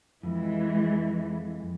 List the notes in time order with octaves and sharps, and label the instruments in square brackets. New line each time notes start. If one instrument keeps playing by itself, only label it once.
[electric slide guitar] F2 [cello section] E3 G#3